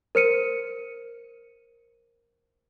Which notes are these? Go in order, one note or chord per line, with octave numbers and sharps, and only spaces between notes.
A#4 C5 C#7 D#7